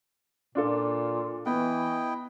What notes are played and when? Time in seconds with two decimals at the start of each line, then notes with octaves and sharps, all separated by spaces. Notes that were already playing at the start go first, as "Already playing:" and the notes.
0.55 A#2 D4 F4 A4
1.46 E3 B3 E4 D#5 G5